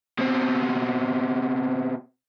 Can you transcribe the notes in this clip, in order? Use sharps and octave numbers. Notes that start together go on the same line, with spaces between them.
B2 C4